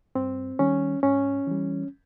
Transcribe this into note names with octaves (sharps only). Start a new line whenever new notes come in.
G2 C4
D#3 G3 C#4
G#2 C#4
E3 G3